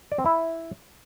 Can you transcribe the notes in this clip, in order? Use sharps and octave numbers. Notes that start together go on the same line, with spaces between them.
D5
C4
E4